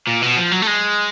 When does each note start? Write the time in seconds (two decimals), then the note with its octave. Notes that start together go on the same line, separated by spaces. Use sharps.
0.07 A#2
0.22 B2
0.37 F3
0.52 F#3
0.62 A3
0.67 G#3